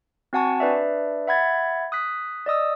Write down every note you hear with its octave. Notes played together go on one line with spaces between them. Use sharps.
C4 F#4 F#5 G#5 A5 C#6
D4 B4 D5 E5
E5 F#5 B5 G#6 A6
D#6 F#6 B6
D5 D#5 D#6 E6